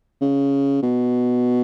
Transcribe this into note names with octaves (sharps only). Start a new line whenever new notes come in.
C#3
B2